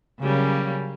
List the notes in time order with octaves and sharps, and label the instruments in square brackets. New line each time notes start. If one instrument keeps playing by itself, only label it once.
[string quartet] C#3 F#3 G3 A#3 C#4